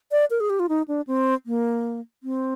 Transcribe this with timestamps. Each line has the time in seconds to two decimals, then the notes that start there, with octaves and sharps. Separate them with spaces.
0.11 D5
0.30 A#4
0.40 G#4
0.50 G4
0.59 F4
0.69 D#4
0.88 D4
1.07 C4
1.46 A#3
2.23 C4